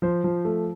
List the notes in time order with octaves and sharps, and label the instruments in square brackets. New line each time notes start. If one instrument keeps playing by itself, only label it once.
[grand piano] F3 C5
F3
A3